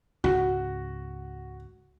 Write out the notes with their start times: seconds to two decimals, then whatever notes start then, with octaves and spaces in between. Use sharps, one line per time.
0.24 C#2 G#2 F#4